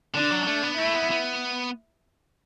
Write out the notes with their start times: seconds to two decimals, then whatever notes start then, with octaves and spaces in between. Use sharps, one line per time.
0.14 D3 D4
0.31 F#3
0.46 A3 D4
0.63 B3
0.78 A3 E4
0.95 B3
1.11 B3